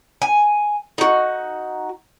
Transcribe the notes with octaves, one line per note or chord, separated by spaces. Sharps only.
G#5
D#4 F#4